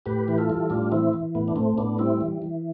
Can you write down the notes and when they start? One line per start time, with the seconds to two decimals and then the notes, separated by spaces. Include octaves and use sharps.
0.06 A2 G4 B4
0.28 E3 B4
0.38 F4 A4
0.50 G3
0.70 A2 D4 F4
0.92 E3 C4 E4
1.13 E3
1.35 A2 B3
1.48 D4
1.56 A2 A3 C4
1.78 A2 B3 D4
1.98 G3 C4 E4
2.21 E3
2.42 E3